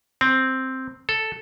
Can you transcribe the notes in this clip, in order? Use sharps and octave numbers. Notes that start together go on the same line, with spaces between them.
C4
A4